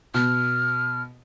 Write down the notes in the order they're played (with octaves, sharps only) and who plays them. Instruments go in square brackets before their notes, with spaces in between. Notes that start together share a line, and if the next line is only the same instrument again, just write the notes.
[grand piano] B2 [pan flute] F6